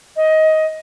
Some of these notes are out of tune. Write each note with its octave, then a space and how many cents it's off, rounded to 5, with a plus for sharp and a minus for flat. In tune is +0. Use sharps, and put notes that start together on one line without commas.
D#5 +15